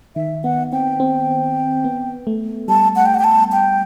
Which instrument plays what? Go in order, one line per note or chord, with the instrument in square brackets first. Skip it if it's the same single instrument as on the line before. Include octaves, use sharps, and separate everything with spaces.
[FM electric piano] D#3 [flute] E5
[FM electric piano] B3 [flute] F#5
[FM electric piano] C4 [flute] G5
[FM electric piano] C4
B3
A3
[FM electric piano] G3 [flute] A5
[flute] F#5
G5
F#5
G5
A5
G5